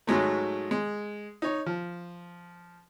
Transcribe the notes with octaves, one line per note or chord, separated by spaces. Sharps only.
G#2 F#3 G#3 A3
G#3
D#4 C#5
F3